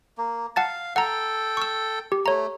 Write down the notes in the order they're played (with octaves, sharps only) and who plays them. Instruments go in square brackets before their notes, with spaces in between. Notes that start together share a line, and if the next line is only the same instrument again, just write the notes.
[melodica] A#3
[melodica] F5 [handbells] F#5 A5 A6
[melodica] A4 G5 [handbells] F#5 A#5
[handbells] C#6 E6
G4
[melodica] A3 [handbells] C#5 A#5